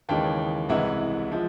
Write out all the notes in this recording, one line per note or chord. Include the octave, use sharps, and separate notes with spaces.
D#2 C#3 E3 G#3 G5 A5
C2 C3 E3 G#3 E5 F#5
F3 G#3